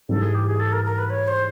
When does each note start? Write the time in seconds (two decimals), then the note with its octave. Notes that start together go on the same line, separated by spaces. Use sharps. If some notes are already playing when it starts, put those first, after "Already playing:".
0.09 G#2 E3 G3 A4
0.22 G#4
0.35 G4
0.47 G#4
0.60 A4
0.73 A#4
0.85 A#4
0.98 B4
1.10 C#5
1.28 C5